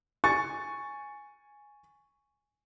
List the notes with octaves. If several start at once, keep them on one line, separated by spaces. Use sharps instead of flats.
G#5 C#6 A6